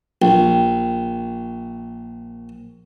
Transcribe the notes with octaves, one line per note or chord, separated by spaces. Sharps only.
A#1 G5